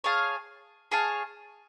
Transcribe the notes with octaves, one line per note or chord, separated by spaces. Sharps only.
G#4 C#5 F5 A5
G#4 C#5 F5 A5